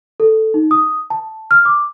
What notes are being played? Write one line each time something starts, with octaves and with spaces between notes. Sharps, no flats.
A4
D#4
D#6
A5
F6
D6